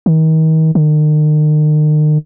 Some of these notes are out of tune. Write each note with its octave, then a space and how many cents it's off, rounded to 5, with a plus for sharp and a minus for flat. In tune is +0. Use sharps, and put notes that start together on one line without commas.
D#3 +35
D#3 -40